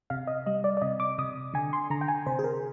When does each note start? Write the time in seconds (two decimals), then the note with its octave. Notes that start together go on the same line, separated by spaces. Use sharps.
0.10 C3 F5
0.27 D#5
0.46 G3 D#5
0.64 D5
0.77 D5
0.82 C3 D#5
1.00 D6
1.18 C3 D#6
1.54 D3 G#5
1.73 C6
1.90 D3 A#5
2.01 G5
2.08 G#5
2.26 C3 C5
2.39 G#4
2.44 A#4